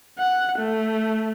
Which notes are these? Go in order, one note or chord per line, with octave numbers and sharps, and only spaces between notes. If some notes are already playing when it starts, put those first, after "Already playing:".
F#5
A3